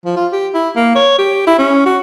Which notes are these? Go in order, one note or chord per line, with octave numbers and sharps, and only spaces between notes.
F3
F4
G4
E4
A#3
C#5
G4
E4
C#4
F#4